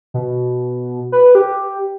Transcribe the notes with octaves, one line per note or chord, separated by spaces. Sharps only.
B2
B4
G4